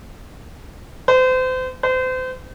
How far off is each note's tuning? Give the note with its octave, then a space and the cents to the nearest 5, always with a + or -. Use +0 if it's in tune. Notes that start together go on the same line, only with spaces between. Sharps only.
C5 -35
C5 -35